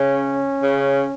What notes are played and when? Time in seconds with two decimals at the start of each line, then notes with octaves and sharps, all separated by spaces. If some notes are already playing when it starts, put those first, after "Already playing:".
Already playing: C#3 C#4
0.63 C#3